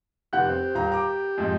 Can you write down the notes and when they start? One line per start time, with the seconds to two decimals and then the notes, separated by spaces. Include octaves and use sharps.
0.33 F1 G4 F#5 F#6
0.49 C4
0.75 D#1 F4 A#5
0.92 A#5 D6
1.38 F2 G#2